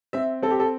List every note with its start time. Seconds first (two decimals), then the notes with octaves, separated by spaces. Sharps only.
0.13 C4 E5
0.42 C4 A4
0.51 G4
0.60 A4